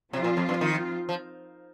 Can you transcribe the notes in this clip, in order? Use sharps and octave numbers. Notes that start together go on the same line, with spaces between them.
C3 F3 C4 F4
A#2
F2
G2
D#3
F3